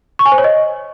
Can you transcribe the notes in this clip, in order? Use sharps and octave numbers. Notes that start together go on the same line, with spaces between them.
C#6
G#5
C5
C#5
D#5